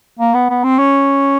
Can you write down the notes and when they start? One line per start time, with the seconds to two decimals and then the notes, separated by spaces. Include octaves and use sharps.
0.19 A#3
0.34 B3
0.50 B3
0.63 C4
0.79 C#4